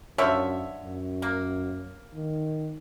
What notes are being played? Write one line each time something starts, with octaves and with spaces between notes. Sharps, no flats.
F#2 D3 F3 C#5 E5
F#2
A#3
D#3